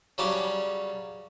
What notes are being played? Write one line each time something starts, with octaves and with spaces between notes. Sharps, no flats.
C#3 F#3 G3 C#4 A5 D6